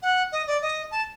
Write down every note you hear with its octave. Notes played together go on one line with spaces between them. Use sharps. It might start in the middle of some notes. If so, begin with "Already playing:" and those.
F#5
D#5
D5
D#5
A5